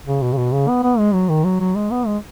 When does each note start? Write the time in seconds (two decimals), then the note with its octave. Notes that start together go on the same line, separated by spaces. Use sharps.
0.07 C#3
0.22 B2
0.33 C#3
0.38 B2
0.52 C#3
0.68 B3
0.83 B3
0.99 G#3
1.14 F#3
1.29 D#3
1.44 F#3
1.60 F#3
1.76 G#3
1.91 B3
2.07 G#3